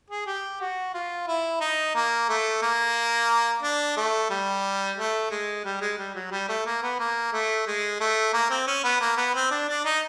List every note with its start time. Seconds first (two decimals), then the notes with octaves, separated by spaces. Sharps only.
0.10 G#4
0.26 G4
0.60 F#4
0.94 F4
1.27 E4
1.61 D#4
1.95 A#3
2.29 A3
2.62 A#3
3.62 D4
3.97 A3
4.30 G3
4.97 A3
5.31 G#3
5.65 G3
5.81 G#3
5.98 G3
6.15 F#3
6.31 G3
6.49 A3
6.66 A#3
6.82 B3
6.99 A#3
7.33 A3
7.67 G#3
8.00 A3
8.33 A#3
8.50 C4
8.67 C#4
8.84 B3
9.01 A#3
9.17 B3
9.35 C4
9.51 D4
9.69 D4
9.85 D#4